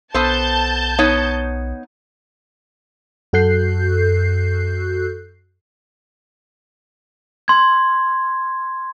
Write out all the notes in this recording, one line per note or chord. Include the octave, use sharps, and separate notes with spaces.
B1 B3 A4 C5 A5 G6
B3 D#4 C#5
F#2 F#4 A4 F#6 G6 C7
C6 G#6